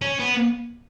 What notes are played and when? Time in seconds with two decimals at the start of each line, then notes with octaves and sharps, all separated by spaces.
0.02 C#4
0.20 B3